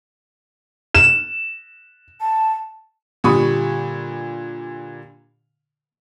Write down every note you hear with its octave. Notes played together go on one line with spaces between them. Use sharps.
E7
A5
A#2 D3 G3 B5 C#6 D#6